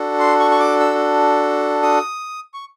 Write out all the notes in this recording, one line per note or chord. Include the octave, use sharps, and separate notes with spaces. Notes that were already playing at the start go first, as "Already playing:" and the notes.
Already playing: D4 F#4 A4
C6
C#6
C#6
D6
E6
D#6
C#6